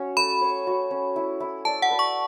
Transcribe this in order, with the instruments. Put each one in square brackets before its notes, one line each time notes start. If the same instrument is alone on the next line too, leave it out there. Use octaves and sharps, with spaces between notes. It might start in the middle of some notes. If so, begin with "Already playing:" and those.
Already playing: [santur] C#4 F#4 C#5
[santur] A3 [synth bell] B5
[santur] C#5
F#4
C#4
E4
E4
[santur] D5 [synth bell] A5
[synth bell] F#5
[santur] B4
[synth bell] C#6